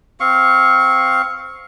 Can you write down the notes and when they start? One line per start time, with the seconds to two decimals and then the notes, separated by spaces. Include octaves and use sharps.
0.20 C4 F5 C#6